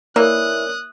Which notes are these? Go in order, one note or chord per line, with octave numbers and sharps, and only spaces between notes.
E3 A#3 A#4 C#5 D5 D#6 F#6